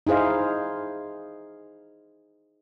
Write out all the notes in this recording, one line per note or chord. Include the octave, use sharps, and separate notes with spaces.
D#4 E4 G#4 C5 F5